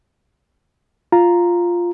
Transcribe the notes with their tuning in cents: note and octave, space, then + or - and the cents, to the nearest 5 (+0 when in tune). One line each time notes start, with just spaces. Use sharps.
F4 +0 A#5 +0